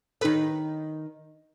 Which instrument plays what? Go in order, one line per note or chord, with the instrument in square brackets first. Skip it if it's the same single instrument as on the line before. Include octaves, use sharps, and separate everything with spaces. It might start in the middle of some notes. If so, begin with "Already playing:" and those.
[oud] D#3 B4 [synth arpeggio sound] D#4 A4